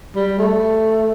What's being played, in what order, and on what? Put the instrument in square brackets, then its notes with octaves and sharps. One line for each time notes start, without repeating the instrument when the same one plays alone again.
[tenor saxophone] G3
A3